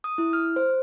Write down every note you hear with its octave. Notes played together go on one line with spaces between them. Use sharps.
D#6
E4
F6
C5